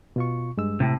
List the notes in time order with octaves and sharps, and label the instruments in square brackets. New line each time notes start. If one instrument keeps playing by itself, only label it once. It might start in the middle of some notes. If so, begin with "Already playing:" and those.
[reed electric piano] B2 F4 C#6
G2 G#3 E6
[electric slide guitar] A2 C3